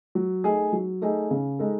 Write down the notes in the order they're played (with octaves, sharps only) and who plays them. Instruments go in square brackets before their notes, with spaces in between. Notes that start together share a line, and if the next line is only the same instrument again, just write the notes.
[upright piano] F#3
A3 D#4 G#4
F#3
A3 D#4 G#4
C#3
G#3 D#4 A4